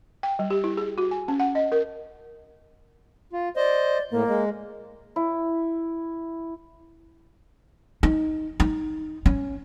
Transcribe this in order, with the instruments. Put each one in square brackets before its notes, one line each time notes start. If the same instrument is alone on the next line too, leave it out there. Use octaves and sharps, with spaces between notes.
[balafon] G5
G3
G4
E4
G#4
F#4
G#5
C#4
F#5
D#5
A#4
[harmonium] F4
[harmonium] C5 D#5 [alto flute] D5
[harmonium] A2 [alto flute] A#3
[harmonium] G#3
[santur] E4
[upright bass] D#4
D#4
C#4